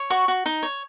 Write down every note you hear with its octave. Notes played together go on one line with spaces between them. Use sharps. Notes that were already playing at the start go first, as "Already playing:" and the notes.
Already playing: C#5
F#4 C#6
F#4
D#4
C#5